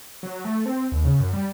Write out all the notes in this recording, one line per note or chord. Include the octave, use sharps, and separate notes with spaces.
F#3
A3
C4
D#2
C#3
F#2
G3